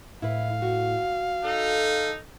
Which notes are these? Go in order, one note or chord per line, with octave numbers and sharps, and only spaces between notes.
A2 E4 B4 F5
F#4
D#4 A4